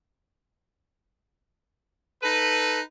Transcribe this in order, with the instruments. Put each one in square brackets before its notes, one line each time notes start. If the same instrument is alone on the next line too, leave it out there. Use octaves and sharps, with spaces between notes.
[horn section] D#4 A4 B4